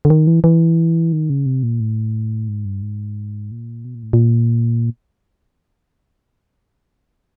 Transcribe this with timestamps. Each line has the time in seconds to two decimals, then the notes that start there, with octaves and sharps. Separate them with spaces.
0.05 D3
0.10 D#3
0.27 E3
0.44 E3
1.13 D#3
1.30 C#3
1.46 C3
1.63 A#2
1.80 A2
2.48 G#2
2.65 G2
2.82 G#2
3.51 A#2
3.85 B2
3.95 A#2
4.03 A2
4.13 A#2